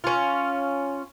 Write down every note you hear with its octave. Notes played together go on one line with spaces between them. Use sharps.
C#4 F4